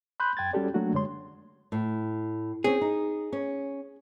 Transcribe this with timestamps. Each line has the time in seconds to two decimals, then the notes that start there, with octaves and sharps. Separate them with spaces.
0.20 B5 C6 F#6 G6
0.37 F#2 G5 G#6 A6
0.53 G3 C#4 F#4 G4 A4 D5
0.74 F#3 A3 A#3 D4 F#4
0.92 F#2 D3 G#3 C#5 C6
1.72 A2
2.64 C4 C#4 G#4
2.81 D#4
3.33 C#4